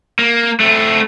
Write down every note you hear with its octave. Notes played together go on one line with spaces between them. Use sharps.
A#3
A3 C4